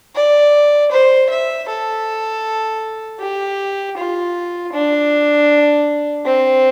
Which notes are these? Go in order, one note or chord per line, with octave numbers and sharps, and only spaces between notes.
D5
C5
E5
A4
G4
F4
D4
C4